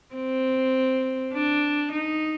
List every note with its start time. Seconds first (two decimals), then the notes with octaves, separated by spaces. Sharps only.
0.14 C4
1.33 D4
1.92 D#4